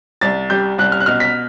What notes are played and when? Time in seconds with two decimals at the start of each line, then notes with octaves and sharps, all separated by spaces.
0.21 C2 A6
0.50 G3 G6
0.78 C2 F#6
0.92 F6
1.00 F#6
1.06 B2 F6
1.20 B6